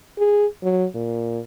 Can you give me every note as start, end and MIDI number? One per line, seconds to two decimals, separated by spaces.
0.18 0.46 68
0.63 0.85 54
0.95 1.39 46